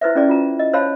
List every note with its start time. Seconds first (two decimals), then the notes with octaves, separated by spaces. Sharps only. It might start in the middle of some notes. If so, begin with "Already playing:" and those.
0.01 E4 B4 C5 E5
0.15 C#4 E4 G#4 D5
0.29 F4 A#5
0.59 D#5
0.73 C5 C#5 F5 A5 B5